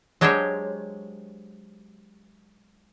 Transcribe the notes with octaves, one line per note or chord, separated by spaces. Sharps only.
F#3 G#3 D4 G4 C5 C#5